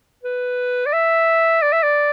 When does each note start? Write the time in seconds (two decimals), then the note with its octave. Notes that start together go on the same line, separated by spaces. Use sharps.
0.23 B4
0.86 D5
0.93 E5
1.62 D5
1.72 E5
1.83 D5